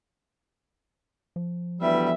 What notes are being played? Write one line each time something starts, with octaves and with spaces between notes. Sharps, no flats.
F3
D2 E3 G3 B3 E5